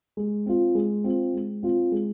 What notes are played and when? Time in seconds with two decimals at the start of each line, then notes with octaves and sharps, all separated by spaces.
0.17 G#3
0.46 C4 F4
0.75 G#3
1.04 C4 F4
1.34 G#3
1.63 C4 F4
1.92 G#3